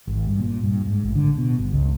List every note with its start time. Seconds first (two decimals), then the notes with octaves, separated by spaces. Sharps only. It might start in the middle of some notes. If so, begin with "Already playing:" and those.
0.07 G#1
0.27 G2
0.39 A#2
0.63 G2
0.87 G#2
1.03 A1
1.15 D3
1.38 B2
1.58 G1
1.73 C#2